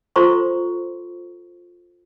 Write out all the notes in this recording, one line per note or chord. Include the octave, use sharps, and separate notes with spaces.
F4 A4 C5 A#5 C6 C#6